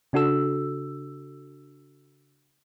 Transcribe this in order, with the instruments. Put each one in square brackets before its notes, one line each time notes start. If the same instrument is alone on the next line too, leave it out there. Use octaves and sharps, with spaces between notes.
[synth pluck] C#3 D4 F#4 A4 E6